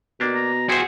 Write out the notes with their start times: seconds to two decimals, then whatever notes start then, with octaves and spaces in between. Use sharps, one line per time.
0.20 B2 A#3 D4 G4
0.34 A#5
0.70 E4 F#4 G#4 C5 C6